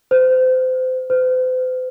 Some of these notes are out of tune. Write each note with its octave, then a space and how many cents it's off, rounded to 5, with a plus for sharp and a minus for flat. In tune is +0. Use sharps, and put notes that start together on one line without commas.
C5 -30
C5 -45